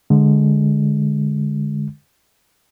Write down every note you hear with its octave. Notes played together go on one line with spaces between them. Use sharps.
D3 G#3